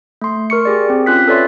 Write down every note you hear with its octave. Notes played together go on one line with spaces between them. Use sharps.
A3 C6
A#4 C#6 C#7
G4 G#4 D5
C4
C#4 F4 F#6 B6
A4 B4 C#5 D5 E5 C6